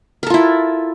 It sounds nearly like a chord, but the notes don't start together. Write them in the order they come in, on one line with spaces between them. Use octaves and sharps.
A#4 A4 F4 E4